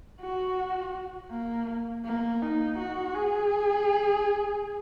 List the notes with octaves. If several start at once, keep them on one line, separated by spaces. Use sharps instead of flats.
F#4
A#3
A#3
D#4
F#4
G#4